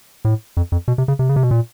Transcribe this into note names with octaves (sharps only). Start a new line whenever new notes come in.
A2
F2
F2
B2
C3
C#3
C3
C#3
C3
B2
A#2